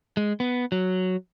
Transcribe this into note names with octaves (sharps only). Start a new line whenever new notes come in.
G#3
B3
F#3